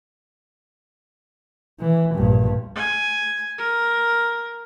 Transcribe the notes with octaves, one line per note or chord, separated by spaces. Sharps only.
E3
A#1 G2
G#5
A#4